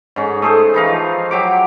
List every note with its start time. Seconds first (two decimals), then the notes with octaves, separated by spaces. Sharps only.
0.16 G#2 C#4
0.42 A3 G#4 C5
0.74 E3 D#4 F5
0.88 F3
1.31 F#3 G4 D6